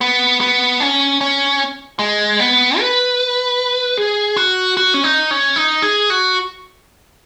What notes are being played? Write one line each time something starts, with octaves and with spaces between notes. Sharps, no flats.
B3
B3
C#4
C#4
G#3
B3
B4
G#4
F#4
F#4
C#4
D#4
C#4
D#4
G#4
F#4